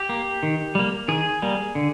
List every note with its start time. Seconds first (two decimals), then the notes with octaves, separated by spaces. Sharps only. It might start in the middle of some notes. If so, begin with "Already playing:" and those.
Already playing: G4
0.09 A#3
0.43 D#3
0.75 G3 A#3
1.08 D#3 G#4
1.42 G3 A#3
1.75 D3